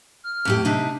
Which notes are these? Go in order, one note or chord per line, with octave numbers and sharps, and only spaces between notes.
F6
F2 A2 G4
C3 D4 D#4 G4